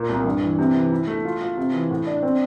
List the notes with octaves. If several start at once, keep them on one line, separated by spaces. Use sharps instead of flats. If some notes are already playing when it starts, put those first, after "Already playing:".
Already playing: A#2
C2
G2
E3
C3
E3
E4
A3
F4
F4
C3
E3
A2
D4
C4